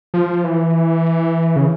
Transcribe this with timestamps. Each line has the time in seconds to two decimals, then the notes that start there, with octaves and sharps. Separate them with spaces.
0.14 F3
0.44 E3
1.56 C#3